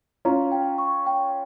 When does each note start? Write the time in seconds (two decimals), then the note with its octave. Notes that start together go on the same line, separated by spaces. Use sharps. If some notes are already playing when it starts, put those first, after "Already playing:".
0.25 C#4 F4 A#5
0.52 G5
0.78 C#6
1.06 G5